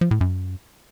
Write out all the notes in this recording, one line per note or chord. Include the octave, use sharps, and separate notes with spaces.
F3
A2
F#2